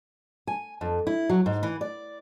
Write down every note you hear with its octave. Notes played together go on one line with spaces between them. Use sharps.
G#5
F2
E4
F#3
G#2
E3
D5